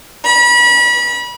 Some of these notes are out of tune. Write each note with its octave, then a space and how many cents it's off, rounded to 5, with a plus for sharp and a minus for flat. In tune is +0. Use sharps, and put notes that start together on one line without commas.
B5 -35